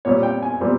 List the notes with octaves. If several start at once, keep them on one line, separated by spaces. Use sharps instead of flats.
A#2 G3 C4 C#5
G5
G#5
A#2 G3 C4